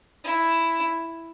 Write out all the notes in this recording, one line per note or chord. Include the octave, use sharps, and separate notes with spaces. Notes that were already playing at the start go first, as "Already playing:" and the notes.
E4